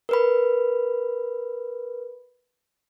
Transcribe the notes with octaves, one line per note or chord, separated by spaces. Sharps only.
A#4 B4 B5